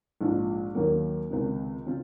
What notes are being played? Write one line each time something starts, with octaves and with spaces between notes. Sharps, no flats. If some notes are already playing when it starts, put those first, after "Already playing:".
A#1 G#2 F3
D#2 D#3 F#3 A#3
C#2 C3 D#3
C#3 F3 C4 F4